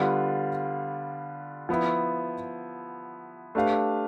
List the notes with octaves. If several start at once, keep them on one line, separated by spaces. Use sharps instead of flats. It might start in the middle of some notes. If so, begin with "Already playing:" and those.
Already playing: D3 G3 B3 F4
F3 B3 E4
A3 D4 G4 B4 F5